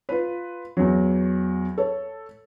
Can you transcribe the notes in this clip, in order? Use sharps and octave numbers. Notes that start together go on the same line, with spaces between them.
F4 B4
E2 F#3
A4 C#5